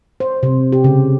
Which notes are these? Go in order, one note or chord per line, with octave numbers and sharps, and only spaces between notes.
C5
C3
G4
C#3